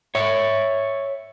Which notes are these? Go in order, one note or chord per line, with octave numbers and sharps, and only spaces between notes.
C#5 E5